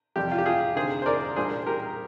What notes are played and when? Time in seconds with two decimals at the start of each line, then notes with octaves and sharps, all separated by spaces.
0.16 F2 C3 G3 G4
0.31 F4
0.38 G4
0.46 F4 G#4
0.76 D2 C3 D#3 G#4 C5
1.02 C5
1.06 A#4 D5
1.36 C2 A#2 G3 D4 G#4 C5
1.66 G4 A#4